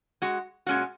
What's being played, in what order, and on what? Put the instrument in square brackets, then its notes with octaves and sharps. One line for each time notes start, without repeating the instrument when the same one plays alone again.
[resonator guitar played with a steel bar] G#3 F#4
A#2 G#3 C#4 F#4